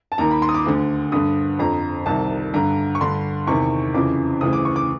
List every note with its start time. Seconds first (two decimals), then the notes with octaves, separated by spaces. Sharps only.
0.12 A5
0.18 D#2 D#3 A#5
0.31 B5
0.42 C6
0.49 D#6
0.54 D6
0.66 D2 D3
1.12 G2 D3 D#6
1.59 F2 D3 A#5
2.06 C2 C3 D#3 A5
2.54 G2 D3 A#5
2.95 C#6
3.01 G2 D3 C6
3.47 E2 C3 D#3 C#6
3.94 F2 C#3 E3 D6
4.41 D2 C#3 E3 D#6
4.53 D6
4.65 C#6
4.76 D6